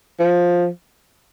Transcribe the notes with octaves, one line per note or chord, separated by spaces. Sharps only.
F3